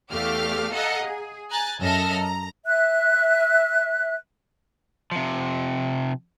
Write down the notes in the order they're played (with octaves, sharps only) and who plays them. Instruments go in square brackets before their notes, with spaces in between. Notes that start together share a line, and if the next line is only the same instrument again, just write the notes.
[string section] E2 A3 G4 F5 D6 F6
A4 D#5 F5 F#5 G#5 A#5
G#4
G#5 A#5 F#6 A6
F#2 A4 D#5 E5 F6 A#6
A#5
[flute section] E5 F#6
[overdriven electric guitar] C3 F3